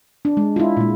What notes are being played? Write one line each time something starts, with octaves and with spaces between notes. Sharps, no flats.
D4
G#3
E4 F4
A#2 G#3